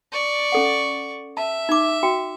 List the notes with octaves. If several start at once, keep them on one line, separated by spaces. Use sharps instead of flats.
D5 C#6
C#4 A4 F#5
E5 A5
D#4 D6
F#4 G5